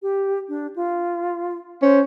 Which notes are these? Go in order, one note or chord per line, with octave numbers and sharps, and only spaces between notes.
G4
D4
F4
C#4 C5